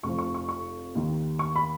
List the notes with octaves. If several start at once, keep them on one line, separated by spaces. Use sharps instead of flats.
F1 F2 F3 C#6
C#6
C#6
C#6
D#2 D#3
C#6
B5